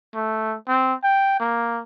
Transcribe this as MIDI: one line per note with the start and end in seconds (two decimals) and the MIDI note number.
0.15 0.55 57
0.68 0.94 60
1.04 1.39 79
1.40 1.82 58